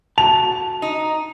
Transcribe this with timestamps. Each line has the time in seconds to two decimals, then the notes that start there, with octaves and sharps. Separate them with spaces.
0.18 F#4 A5 F7
0.82 D#4